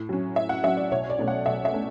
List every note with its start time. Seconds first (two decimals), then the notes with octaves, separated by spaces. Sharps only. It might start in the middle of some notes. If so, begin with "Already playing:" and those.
Already playing: A2
0.09 F#3 C#4
0.36 A2 E5
0.49 F#5
0.63 F#3 C#4 E5
0.77 D5
0.91 B1 C#5
1.10 D5
1.19 B2 A3 C#4
1.28 F#5
1.46 B1 E5
1.65 E5
1.73 A3 C#4